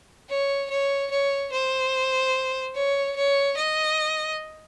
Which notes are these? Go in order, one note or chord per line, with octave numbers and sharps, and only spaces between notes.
C#5
C#5
C#5
C5
C#5
C#5
D#5